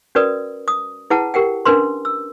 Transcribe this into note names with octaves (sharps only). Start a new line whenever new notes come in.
C#4 F#4 A#4 B4 D5 D#6
D#6
E4 G#4 B4 F#5 A5
G4 A#4 F#5 G5
C#4 D4 A#4 B4 C6
E6